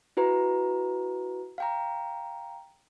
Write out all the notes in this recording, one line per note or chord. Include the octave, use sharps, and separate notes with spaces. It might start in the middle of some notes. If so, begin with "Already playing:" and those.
E4 F#4 B4 A#5
F5 G5 A#5